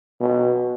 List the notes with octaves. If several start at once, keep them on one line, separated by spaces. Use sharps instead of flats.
B2